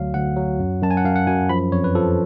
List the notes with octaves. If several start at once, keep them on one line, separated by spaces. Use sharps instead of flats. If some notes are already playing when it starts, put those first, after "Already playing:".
Already playing: D2 F#3 F5
D2 F#5
F#3
F#2
F#2 A5
G#5
F#5
F#2 F5
F#5
F#2 G#5
F3 B5
F2 C#5
B4
F3 A4